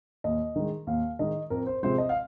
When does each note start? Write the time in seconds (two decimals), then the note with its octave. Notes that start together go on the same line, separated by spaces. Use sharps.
0.24 D#2 D#5
0.56 D#3 G#3
0.87 D#2 F5
1.19 D#3 G#3 D#5
1.50 F2 A#4
1.67 C5
1.83 C3 F3 G#3 C5
1.98 D#5
2.09 F5